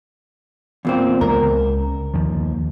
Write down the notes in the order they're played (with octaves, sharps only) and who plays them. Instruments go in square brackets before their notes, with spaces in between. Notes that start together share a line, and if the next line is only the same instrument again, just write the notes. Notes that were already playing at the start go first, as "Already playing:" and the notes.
[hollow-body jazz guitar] E2 A#2 C4
[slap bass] C#2 [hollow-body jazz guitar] A#4
[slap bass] D#2 F3